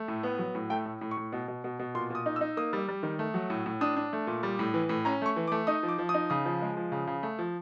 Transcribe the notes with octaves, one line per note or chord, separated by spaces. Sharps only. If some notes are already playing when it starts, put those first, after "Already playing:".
Already playing: A3
A2
B3
F#3
A2
A3 G5
A2
A2
C#6
A2
B2
B2
B2
B2
A#2 C6
A#2 D#6
D#4
E6
D#4
A#3 D#6
G3
G3
D#3
A3
F#3
A2
A2
D4 D#6
D4
A3
A#2
G3
A2
E3
A2
C#4 A#5
A3 C#6
E3
D6
A3
D#4 D#6
F3
D6
F3
D#6
D#4
C#3 D#6
F3
G#3
F3
C#3
C#3
A3
F3